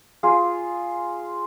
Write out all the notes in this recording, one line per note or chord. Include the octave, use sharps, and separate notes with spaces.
F4 G#4